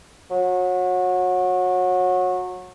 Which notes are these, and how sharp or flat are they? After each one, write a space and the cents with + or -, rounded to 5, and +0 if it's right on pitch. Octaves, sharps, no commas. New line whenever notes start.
F#3 -25